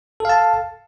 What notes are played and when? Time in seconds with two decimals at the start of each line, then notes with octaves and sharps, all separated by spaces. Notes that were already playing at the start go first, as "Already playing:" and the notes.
0.20 A4
0.25 F5
0.29 A5